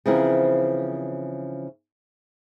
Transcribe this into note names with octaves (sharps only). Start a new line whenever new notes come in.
C#3 E3 F3 C4 E4 A#4